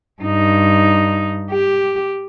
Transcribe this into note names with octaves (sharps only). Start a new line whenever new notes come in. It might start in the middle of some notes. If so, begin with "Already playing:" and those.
G2 D#4
G4